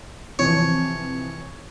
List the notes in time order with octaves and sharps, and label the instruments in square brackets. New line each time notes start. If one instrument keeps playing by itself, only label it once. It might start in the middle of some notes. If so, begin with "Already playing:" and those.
[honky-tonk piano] C3 E3 F3 [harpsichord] C#5